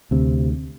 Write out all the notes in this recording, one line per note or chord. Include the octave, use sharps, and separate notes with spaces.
D2 C3